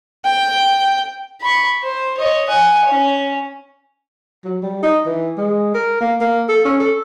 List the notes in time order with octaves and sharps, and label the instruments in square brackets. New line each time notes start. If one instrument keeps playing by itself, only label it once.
[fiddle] G5
[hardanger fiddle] B5 C#6
C5
C#5 D#5
F#5 G#5
C#4 C#5
[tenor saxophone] F#3
G3
D#4
E3
G#3
A#4
A#3
A#3
A4
C#4
A4